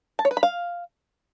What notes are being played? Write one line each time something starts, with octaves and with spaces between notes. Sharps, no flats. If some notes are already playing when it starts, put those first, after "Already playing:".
A5
C#5
B4
B5
F5